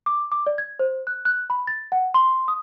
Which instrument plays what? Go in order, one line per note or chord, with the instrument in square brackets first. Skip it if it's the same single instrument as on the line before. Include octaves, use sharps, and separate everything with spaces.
[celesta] D6
D6
D5
G#6
C5
F#6
F#6
B5
A6
F#5
C6
D#6